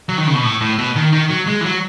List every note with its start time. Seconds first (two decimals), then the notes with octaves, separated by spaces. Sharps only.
0.09 F#3
0.18 D#3
0.27 C#3
0.35 B2
0.43 A2
0.61 A2
0.78 B2
0.96 D#3
1.13 D#3
1.30 F#3
1.47 G#3
1.61 E3
1.65 F#3